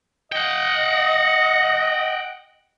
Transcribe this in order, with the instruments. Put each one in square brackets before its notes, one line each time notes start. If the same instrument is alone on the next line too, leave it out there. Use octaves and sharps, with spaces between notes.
[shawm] D#5 [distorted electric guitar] F#5 G5